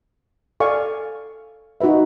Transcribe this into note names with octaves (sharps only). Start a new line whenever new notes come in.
A4 D5 F5 G#5 C#6
D#4 F#4 B4 E5